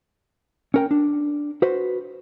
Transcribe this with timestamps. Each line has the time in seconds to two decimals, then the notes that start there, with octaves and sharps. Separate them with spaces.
0.74 C#4 A#4 G5
0.91 D4
1.62 F#4 B4 C5